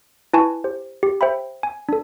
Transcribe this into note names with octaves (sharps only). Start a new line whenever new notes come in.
E4 B4 G#5 A5 C#6
G4 C5
G4
C5 E5 G5 B5
G#5
D4 A4